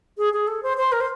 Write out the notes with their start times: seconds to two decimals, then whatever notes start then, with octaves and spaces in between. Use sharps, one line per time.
0.18 G#4
0.33 G#4
0.47 A4
0.63 C5
0.77 C5
0.92 A#4
1.01 C5